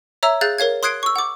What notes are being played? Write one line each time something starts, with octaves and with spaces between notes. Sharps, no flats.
C#5 E5 A#5 E6
G#4 F5 F#6 G6 A6
A#4 C#5 F5 G#6
C6 D#6 F#6 G#6 C7 D7
C#6 E6
F#5 D6